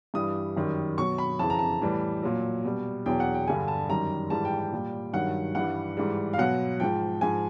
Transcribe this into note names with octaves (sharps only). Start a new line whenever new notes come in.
G2 E3 G3 D#6
F#2 D#3 G3
B2 F#3 C#6
B5
F2 C#3 E3 A5
A#5
A5
A2 E3 G3
A#2 F#3
B2 G3
E2 B2 F#3 G5
F#5
G5
G2 D3 G3 G#5
A5
F#2 D#3 G3 A#5
G#2 E3 G3 A5
G5
G5
A#2 G3
G2 D#3 F#3 F#5
G2 E3 G3 F#5
G#2 E3 G3
F5
B2 F#3 F#5
G#2 F3 G5
G#2 F3 G#5